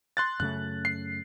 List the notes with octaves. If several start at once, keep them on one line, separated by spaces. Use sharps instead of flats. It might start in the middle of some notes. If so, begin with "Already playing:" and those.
C6 F#6 A6
F#2 C#3 A3 F#6
C7